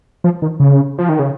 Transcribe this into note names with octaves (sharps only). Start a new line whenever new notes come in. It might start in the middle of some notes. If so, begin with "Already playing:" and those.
F3
D#3
C#3
F3
D#3
C#3